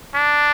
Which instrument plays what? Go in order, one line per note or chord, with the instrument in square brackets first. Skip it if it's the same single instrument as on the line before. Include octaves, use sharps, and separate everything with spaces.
[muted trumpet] D4